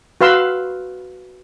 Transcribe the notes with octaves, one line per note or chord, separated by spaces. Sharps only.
F#4 B4 F5 C6 E6